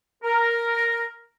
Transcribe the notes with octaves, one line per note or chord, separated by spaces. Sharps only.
A#4